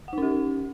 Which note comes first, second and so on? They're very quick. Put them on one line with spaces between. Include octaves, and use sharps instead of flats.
F#5 D#4 C#4 G4